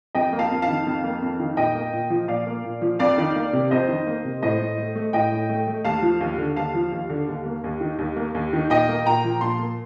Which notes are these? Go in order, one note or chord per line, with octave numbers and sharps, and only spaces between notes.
F2 D#5 G5
A#3
F5 A5
F2
F5 A5
D#3
F2
A#3
F2
D#3
A#2 D#5 G5
A#3
A#2
F3
A#2 D5 F5
A#3
A#2
F3
F2 D5 F5
D#3
A#3
C3
F2 C5 D#5
D#3
A#3
C3
A2 C5 D#5
A2
A3
A3
A2 D#5 G5
A2
A3
A3
D#2 F5 A5
F3
D#2
D3
D#2 F5 A5
F3
D#2
D3
D#2
A#3
D#2
D#3
D#2
A#3
D#2
D#3
A#2 D#5 G5
A#3
A#2 G5 A#5
F3
A#2 A5 C6
A#3